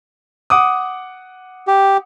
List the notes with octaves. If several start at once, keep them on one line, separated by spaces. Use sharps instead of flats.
F#5 D6 D#6
G4